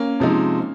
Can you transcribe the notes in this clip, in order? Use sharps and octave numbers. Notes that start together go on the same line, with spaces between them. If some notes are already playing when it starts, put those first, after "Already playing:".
Already playing: A#3 C#4
C3 F3 G#3 D#4